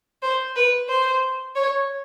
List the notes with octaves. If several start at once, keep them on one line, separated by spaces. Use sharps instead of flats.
C5
B4
C5
C#5